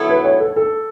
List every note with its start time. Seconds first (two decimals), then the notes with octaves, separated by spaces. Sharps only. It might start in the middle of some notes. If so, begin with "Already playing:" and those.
Already playing: F#3 B3 E4 A4
0.09 B4
0.25 C#5
0.40 A4
0.56 A4